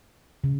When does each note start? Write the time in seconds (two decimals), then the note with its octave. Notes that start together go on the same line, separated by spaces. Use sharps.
0.44 C#3